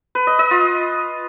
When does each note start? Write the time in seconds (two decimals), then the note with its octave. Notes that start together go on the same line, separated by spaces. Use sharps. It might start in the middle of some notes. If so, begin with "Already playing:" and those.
0.15 B4
0.27 D#5
0.39 D#5
0.51 F4